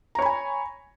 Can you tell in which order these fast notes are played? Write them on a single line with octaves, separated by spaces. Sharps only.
A#5 C#5 B5 G#5